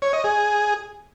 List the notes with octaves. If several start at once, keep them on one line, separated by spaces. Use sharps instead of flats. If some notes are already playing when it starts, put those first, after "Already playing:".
C#5
D#5
G#4